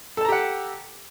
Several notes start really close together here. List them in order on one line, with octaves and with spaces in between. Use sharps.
A4 A5 A#5 G4 F#5